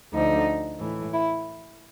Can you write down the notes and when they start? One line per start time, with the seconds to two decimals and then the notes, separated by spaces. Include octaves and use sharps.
0.14 D2 D3 F3 D#4
0.79 A2 E3
1.12 E4